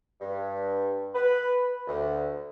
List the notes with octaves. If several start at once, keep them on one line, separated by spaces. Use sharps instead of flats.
G2
B4
D2